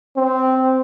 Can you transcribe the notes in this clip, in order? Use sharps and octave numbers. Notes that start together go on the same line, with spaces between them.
C4